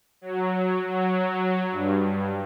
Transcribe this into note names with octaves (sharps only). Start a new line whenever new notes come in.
F#3
F#3
G2